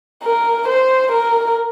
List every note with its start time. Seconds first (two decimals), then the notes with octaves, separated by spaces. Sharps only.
0.23 A#4
0.68 C5
1.12 A#4